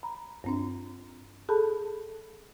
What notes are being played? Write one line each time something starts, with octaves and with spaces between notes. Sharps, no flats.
A#5 B5
G2 C4 D4
G#4 A4 A5 B5